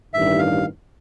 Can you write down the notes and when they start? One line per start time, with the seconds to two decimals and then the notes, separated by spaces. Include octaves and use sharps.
0.14 A1 G2 D#3 E5
0.39 F5